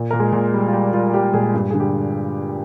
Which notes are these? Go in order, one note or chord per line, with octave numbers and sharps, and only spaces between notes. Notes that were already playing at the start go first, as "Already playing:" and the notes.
Already playing: A#2
A#2 A#4
G#3 G#4
A#2
G3
F4
G3 G4
G3 F4
G3 G4
A#2 G#3 G#4
G2
D3 G#4
G4